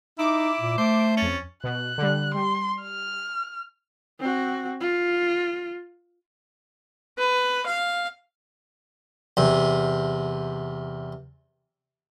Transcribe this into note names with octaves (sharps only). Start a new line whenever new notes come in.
D#4 E4 D6
A#2
A3 C5
F2 C#4 A6
B2 F#6
D3 G3
G3 C6
F6
C4 F#4
F4
B4
F5
E2 C3